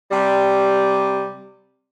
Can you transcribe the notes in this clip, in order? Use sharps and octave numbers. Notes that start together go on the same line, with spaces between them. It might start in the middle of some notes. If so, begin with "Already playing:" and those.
C3 G3